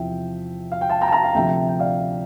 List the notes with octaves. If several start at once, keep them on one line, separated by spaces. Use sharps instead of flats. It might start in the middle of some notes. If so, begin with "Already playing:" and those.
Already playing: E2 C3 F3 E5 G5
F5
G5
F5 A5
G5 A#5
A5
G5 A#5
F5 A5
D2 C3 F3 E5 G5
G5
D5 F5